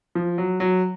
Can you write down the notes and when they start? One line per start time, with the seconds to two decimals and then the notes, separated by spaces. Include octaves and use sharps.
0.15 F3
0.38 F#3
0.60 F#3